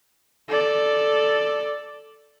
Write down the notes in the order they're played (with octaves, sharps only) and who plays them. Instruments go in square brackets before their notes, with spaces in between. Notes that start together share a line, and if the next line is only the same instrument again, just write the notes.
[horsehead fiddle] A4 D5